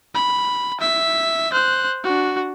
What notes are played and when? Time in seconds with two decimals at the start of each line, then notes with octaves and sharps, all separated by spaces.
0.14 B5
0.80 E5 B6
1.53 C5 F#6
2.04 D4 F#4